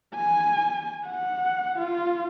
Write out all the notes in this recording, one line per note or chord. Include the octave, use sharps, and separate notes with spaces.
G#5
F#5
F4